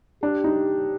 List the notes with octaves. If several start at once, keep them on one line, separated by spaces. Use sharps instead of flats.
D4 G4
D#4